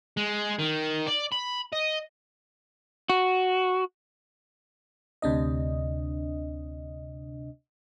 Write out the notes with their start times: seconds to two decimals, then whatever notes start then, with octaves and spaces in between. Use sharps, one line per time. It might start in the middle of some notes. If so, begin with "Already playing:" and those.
0.17 G#3
0.59 D#3
1.07 D5
1.32 B5
1.72 D#5
3.10 F#4
5.22 D2 C3 D4 D#5